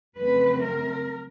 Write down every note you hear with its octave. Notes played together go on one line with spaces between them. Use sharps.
F2 C#3 F#3 A3 C4 B4
A#4